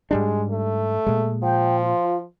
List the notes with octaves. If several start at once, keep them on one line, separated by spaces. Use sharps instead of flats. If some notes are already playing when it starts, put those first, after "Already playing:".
G#2 G3 G#3 D4
A3
A#2 G#3
F3 G5
F4